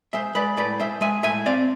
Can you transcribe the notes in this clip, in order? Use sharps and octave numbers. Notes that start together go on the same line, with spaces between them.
G#3 C5 E5
G#3 B4 D5
A2 B4 D5
G#3 C5 E5
G#3 E5 G#5
A2 E5 G#5
C4 D5 F5